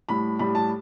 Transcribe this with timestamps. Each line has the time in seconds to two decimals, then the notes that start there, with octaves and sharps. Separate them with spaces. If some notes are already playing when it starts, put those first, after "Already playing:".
0.09 A2 G3 B5
0.39 A2 G3 B5
0.55 A5